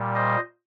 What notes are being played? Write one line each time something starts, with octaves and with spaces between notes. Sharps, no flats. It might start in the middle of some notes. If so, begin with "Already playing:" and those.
Already playing: A#2 G3
C5 D#5